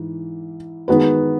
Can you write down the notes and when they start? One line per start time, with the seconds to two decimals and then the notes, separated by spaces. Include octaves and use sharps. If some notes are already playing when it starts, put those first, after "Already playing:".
Already playing: G#2 E3
0.88 D#3 G#3 B3 F#4 B4